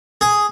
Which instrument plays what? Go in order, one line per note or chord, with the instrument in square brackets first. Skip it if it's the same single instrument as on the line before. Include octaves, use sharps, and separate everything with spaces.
[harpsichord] G#4